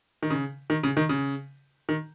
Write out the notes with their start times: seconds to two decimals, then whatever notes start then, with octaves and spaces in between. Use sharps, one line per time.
0.23 D#3
0.30 C#3
0.70 D#3
0.83 C#3
0.97 D#3
1.09 C#3
1.89 D#3